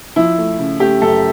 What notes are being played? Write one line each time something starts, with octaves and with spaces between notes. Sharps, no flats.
F3 E4
A3
C#3
A3 G4
F#2 A4